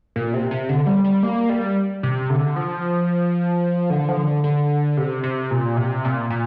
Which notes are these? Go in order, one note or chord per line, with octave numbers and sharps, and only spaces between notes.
A#2
C3
C3
D3
G3
G3
A#3
G3
C3
D3
F3
D3
F3
D3
D3
C3
C3
A#2
C3
A#2
A#2